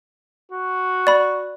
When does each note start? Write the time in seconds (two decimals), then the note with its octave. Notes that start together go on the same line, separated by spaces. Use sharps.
0.52 F#4
1.07 D5 B5